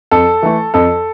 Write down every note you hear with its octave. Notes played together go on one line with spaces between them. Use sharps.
F2 A4
E3 A3
F2 A4